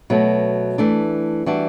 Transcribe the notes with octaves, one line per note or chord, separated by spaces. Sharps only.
B2 F#3 A3
E3 A3 D4
E3 G3 D4 F#4